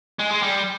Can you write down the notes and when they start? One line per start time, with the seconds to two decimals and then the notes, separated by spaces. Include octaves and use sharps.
0.19 G#3
0.31 G#3
0.43 G3